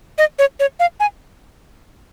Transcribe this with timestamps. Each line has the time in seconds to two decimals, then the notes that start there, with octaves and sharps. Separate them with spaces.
0.18 D#5
0.39 C#5
0.60 C#5
0.80 F5
1.00 G#5